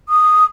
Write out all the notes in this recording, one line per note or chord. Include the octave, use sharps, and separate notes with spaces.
D#6